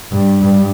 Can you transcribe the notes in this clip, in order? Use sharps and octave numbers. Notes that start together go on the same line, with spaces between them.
G2
G2